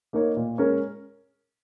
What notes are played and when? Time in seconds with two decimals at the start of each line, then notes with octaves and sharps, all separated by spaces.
0.13 A#3 D#4 A#4 C#5
0.37 A#2
0.58 G#3 C#4 A#4 C#5